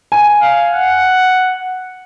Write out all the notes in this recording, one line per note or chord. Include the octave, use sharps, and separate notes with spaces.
G#5
F5
F#5